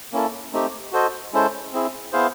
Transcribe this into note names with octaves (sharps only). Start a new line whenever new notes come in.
A#3 C#4 E4 A4
A3 C4 D#4 G4
F#4 A4 C5 D#5
G#3 C#4 E4 A4 C5
C4 E4 G#4
B3 E4 G#4 C5 F5